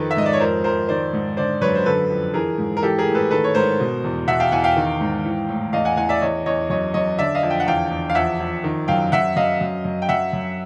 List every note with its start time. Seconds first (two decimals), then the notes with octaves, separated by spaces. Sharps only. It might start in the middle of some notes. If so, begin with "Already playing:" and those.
Already playing: F2 D#3 A4 B4
0.11 E5
0.17 G#2 D#5
0.26 D5
0.33 C#5
0.40 F2 A#4 C5
0.64 F2 A#4 C5
0.89 D#3 C5 D5
1.13 G#2
1.37 D3 C5 D5
1.61 F#2 B4 C#5
1.75 C5
1.86 D3 A4 B4
2.10 F2
2.34 E3 G#4 A#4
2.58 G#2
2.77 A#4
2.83 E3 G4 A4
2.98 G#4 A#4
3.07 A2
3.15 A4 B4
3.31 D#3 A4 B4
3.44 C#5
3.55 G#2 A#4 C5
3.80 B2
4.04 E2
4.27 B2 E5 F#5
4.40 F5 G5
4.52 E2 F#5 G#5
4.64 F5 G5
4.76 D#3
5.01 G#2
5.25 E3
5.49 A2
5.73 E2 D#5 F5
5.85 F#5 G#5
5.97 E2 F#5 G#5
6.09 D5 E5
6.21 E2 C#5 D#5
6.46 E2 C#5 D#5
6.70 F#2 C#5 D#5
6.94 F#2 C#5 D#5
7.18 D3 D5 E5
7.35 D#5 F5
7.43 F2
7.50 G5
7.60 F#5
7.67 E2 F5 G5
7.91 E2
8.10 F5
8.15 F2 E5 F#5
8.40 F2
8.64 D#3
8.88 F#2 F5 G5
9.12 F#2 E5 F#5
9.36 F#2 D#5 F5
9.61 F#2
9.85 F#2
10.02 G5
10.09 F#2 E5 F#5
10.33 F#2